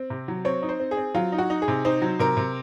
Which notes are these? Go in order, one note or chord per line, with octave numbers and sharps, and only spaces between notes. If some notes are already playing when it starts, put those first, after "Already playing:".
Already playing: C4
C3
F#3
C4 C#5
D#4
C5
C4
G#4
C4
F#3 F4
D#4
F#4
D#4
G#4
C3
D#4 C5
F#3
C3 A#4
C3